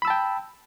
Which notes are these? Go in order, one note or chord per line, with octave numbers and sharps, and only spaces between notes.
G5 A5 B5 E6